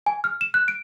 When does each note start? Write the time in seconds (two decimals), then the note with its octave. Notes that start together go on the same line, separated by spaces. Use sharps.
0.06 G#5
0.24 F6
0.41 E7
0.54 F#6
0.68 D7